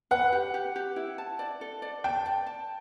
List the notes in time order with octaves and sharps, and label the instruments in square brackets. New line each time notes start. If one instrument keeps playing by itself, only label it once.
[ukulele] B4 [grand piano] F#5
[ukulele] G4
G4
G4
E4
A5
D5
A4
D5
[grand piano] G5 [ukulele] A5
[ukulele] D5
A5